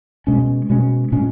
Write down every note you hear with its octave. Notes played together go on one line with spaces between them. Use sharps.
B2 G#3 C#4
B2 G#3 C#4
A#2 G#3 C#4